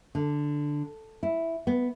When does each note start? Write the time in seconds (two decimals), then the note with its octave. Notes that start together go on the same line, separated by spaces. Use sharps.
0.15 D3
1.23 E4
1.67 B3